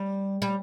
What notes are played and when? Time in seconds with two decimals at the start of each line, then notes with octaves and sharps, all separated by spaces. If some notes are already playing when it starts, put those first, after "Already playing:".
Already playing: G3
0.42 G3